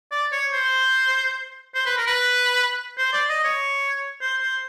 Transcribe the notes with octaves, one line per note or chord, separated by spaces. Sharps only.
D5
C#5
C5
C5
B4
A#4
B4
C5
D5
D#5
C#5
C5
C5